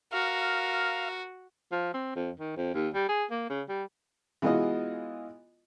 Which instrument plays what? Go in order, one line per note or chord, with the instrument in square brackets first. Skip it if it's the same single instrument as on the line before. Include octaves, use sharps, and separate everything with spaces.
[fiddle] F#4 [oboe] A#4 [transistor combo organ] F5
[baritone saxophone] F3
C4
F2
D#3
F2
D#2
G3
G#4
A#3
C#3
G3
[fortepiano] E3 G#3 B3 F4 F#4 D#5